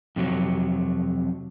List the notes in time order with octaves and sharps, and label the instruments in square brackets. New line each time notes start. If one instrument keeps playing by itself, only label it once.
[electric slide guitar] F2 C3 F#3